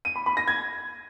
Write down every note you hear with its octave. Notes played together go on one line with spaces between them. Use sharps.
D#7
B5
B5
A#6
G#6